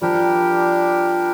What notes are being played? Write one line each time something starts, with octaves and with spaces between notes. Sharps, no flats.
F3 G3 D4 G4 A#4